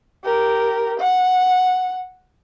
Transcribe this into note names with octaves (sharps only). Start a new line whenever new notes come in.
G4 A#4
F#5